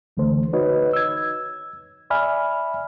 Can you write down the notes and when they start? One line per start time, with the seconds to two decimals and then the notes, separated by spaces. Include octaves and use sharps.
0.17 C#2 D3 E3 A3 C5
0.53 D#4 F#4 B4 C#5 D#5
0.93 E6 G#6
2.10 D5 E5 G#5 B5 F6